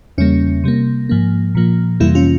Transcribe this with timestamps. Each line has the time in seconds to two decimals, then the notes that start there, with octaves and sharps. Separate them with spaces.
0.18 E2 C#3 G3 A#3 C#4
0.64 C3 G3 A#3
1.09 G#2 F3 A#3
1.55 A#2 F3 A#3
2.00 F2 C3 E3 G3 A#3 E4
2.15 C#4 F4